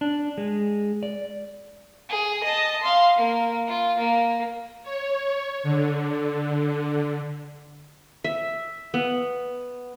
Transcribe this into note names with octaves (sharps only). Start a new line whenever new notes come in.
D4
G#3
D5
G#4
D#5 A5
F5 C6
A#3
F4
A#3
C#5
D3
E5
B3